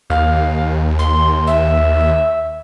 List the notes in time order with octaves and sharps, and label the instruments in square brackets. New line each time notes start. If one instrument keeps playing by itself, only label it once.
[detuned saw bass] D#2 [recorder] F5
[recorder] C6
E5